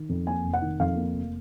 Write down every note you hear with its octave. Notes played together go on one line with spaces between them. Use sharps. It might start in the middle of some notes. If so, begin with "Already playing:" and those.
Already playing: D#3
F2
A#3 G#5
F1
F#5
D#3
F2 F5
A#3
F1